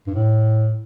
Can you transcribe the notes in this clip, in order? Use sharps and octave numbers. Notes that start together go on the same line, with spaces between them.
G2
A2